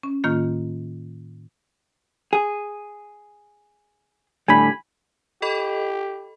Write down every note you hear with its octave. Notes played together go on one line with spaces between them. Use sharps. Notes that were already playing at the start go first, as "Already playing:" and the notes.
C#4
A2 D#3 A#3 F4
G#4
A2 D3 G3 G#5 B5
G4 A4 D#5 B5